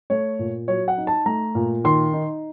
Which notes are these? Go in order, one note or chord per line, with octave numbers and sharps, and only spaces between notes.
A3 C#5
A#2
F#3 C#5
F#5
D#4
A5
A3 A#5
A#2
D#3 C6
D#4